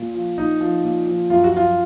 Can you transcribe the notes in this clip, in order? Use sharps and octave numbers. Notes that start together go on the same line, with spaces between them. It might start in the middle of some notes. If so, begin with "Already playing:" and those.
Already playing: A#2
F3
A#2 D#4
F3
A#2
F3
F#2 F4
F#4
F3 F4